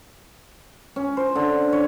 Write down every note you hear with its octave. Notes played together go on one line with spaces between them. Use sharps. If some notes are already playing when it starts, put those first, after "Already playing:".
C#4
C5
D3
C#5